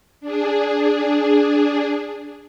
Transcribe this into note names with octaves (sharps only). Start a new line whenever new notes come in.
D4 G#4